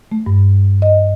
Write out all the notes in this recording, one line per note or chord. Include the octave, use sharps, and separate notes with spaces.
A3
G2
D#5